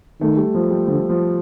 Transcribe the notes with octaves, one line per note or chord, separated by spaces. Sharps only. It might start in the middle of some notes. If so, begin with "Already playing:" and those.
D#3 A3
G3
F3
G3
D3 F3
F3